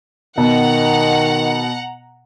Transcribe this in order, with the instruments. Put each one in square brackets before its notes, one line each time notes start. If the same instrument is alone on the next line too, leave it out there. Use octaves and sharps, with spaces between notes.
[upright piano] B2 [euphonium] D#3 [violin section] F#5 A#5